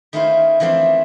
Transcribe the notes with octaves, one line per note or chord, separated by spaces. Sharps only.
D#3 A3 C#4 E4 F4 C5
E3 F3 A3 C4 D4